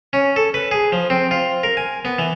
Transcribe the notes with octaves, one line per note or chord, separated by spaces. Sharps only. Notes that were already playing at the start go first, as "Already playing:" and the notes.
C#4
A4
B4
G#4
F3
C4
F4
A#4
G#5
B3
E3